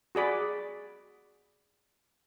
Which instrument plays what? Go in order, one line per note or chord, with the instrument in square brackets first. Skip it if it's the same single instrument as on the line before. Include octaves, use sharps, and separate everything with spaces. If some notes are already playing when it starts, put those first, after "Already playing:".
[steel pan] F#4 G#4 D5 B5